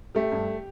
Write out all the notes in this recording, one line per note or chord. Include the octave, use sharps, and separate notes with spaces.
A3 G4
G2